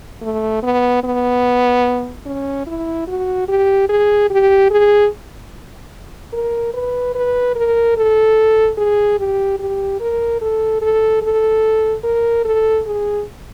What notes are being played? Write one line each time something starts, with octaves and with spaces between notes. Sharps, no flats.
A3
B3
B3
C#4
E4
F#4
G4
G#4
G4
G#4
A#4
B4
B4
A#4
A4
G#4
G4
G4
A#4
A4
A4
A4
A#4
A4
G#4